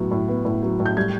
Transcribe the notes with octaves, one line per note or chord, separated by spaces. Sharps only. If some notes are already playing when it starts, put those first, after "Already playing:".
Already playing: A2 F#3 B3
A2
B3
A2
F#3
A2
G6
G3 G#6